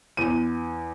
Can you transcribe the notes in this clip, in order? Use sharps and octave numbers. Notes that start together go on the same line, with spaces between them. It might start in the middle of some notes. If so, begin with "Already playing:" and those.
E2 D#7